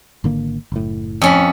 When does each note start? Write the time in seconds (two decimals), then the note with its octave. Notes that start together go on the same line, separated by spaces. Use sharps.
0.24 G#1 D3 A#3
0.72 F#1 A2
1.21 F2 C#4 B5